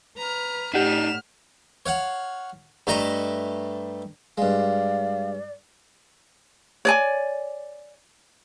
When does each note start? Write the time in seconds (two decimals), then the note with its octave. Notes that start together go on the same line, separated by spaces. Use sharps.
0.18 B4 A#5 F6
0.74 A2 D4 D#4 G4 F#5 F6 B6 E7
1.86 C#5 F5 F#5
2.87 G2 A3 A4 D#5 A#5
4.38 G2 G#3 D5 F5
6.85 C#5 D5 G#5